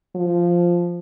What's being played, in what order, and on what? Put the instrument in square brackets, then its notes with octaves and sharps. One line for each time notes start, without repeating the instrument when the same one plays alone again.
[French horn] F3